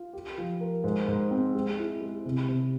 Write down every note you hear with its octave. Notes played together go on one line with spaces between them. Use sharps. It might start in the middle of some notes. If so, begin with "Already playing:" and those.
Already playing: F4
G4
F3
A#4
G#2
G#2
C4
G#3
E4
G#3
C3
C3